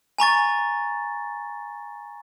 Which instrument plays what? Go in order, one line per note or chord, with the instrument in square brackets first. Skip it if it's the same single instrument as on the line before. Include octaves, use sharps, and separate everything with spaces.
[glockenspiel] G#5 A#5 C#6 A6